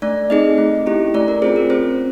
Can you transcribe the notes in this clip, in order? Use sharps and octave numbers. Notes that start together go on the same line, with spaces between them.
A3 D4 D5
C4 D#4 G#4 D#5
A3
C#4 E4 G4
A3 D4 D5
A#4
C4 C#4 F4 G#4 C5
A#4
C4 C#4 C5